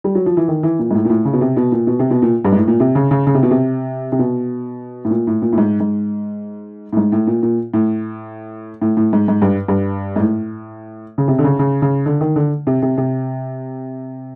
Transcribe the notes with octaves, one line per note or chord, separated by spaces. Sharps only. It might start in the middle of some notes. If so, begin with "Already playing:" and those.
G3
F#3
F3
E3
D#3
E3
A#2
G#2
A2
A#2
A2
C#3
B2
C3
B2
A#2
B2
C3
B2
A#2
G2
G#2
A2
A#2
C3
C#3
C#3
C#3
C3
B2
C3
C3
B2
A2
A#2
A2
A#2
A2
G#2
G#2
A2
G#2
A2
A#2
A#2
A2
A2
A2
G#2
G#2
G2
G2
G#2
A2
C#3
C3
D3
C#3
C#3
C#3
D3
D#3
D3
C3
C3
C3